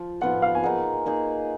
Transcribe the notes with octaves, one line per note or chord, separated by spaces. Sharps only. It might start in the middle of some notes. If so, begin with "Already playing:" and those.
Already playing: F3
F3 B3 F4 F#5
F5
G#5
A#3 D#4 G#4 F#5
A#3 D#4 G#4